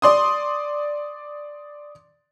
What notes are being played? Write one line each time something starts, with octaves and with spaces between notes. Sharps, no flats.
D5 C6 D#6